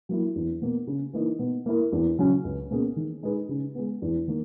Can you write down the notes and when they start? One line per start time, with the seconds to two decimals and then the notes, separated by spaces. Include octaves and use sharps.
0.09 F#3 A#3 E4
0.35 E2
0.62 B2 A#3
0.87 C#3
1.13 E3 A#3 D#4
1.39 B2
1.66 A#3 E4 A#4
1.92 E2
2.19 C#3 F#3 C#4
2.44 C#2
2.71 B2 A#3 C#4 G#4
2.96 D#3
3.23 G#3 D#4 G#4 B4
3.49 C#3
3.75 G#3 B3
4.02 E2
4.28 D#3 A#3